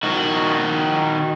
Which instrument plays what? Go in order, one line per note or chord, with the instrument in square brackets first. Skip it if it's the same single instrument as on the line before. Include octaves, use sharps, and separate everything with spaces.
[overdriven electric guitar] D#3 F#4